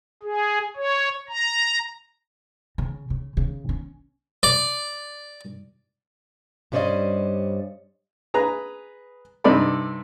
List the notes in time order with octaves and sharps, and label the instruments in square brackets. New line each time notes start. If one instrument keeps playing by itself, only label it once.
[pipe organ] G#4
C#5
A#5
[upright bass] C#3
C#3
C#3
C#4
[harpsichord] D5
[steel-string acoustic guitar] G2 G3 C#4 C5 D5 D#5
[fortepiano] G#4 B4 A#5
G2 C3 D#4 A4 D5 B5